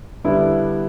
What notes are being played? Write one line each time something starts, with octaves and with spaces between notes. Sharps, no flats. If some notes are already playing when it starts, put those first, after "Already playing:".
D3 G3 B3 D4 E4